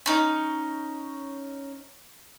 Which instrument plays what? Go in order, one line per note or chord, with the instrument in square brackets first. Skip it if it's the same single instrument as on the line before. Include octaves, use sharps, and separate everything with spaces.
[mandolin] C#4 D#4